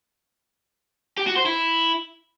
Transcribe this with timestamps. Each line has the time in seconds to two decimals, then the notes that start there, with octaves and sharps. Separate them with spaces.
1.17 G4
1.27 F#4
1.36 C5
1.46 E4